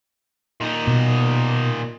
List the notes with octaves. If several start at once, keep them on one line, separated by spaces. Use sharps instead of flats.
A#2 D#4
B2